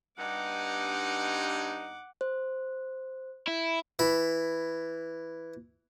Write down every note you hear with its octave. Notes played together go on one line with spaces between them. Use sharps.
G2 D#4 F#5 D6
C5
E4
E3 B5